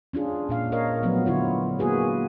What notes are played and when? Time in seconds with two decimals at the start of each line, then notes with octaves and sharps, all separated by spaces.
0.13 C#4 D4 F4 G#4
0.49 A#2 D4 F5
0.72 A#4 C#5 D#5 F5
1.03 F3 F#3 A3 B3
1.26 D3 E4 F4 C#5
1.79 A#3 F#4 G#4 B4